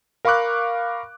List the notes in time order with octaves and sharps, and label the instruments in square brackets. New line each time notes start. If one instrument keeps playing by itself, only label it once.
[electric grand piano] A#4 F5 B5 C#6 D6 F#6